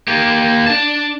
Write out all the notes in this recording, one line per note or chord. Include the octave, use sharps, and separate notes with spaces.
A#3 G4
D4 A5